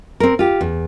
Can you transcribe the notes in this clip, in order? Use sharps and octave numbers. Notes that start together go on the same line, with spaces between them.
C4 A#4
F4 G4
E2